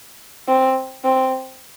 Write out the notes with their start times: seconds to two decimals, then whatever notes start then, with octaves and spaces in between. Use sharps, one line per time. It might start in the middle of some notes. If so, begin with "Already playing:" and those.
0.48 C4
1.04 C4